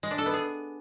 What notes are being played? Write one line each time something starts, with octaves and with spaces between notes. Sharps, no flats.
G#3
D4
A4
B3
G#4